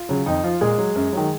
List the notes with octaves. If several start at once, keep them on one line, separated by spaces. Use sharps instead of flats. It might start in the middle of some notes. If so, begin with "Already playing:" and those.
Already playing: F4
C#3 F#3
F2 D#4
F3 F4
A#2 G#3 G#4
F#3
F#2
D#3 F#3